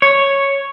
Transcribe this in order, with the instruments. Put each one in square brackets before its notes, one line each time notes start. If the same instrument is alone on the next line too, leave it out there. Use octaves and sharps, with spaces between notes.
[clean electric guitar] C#5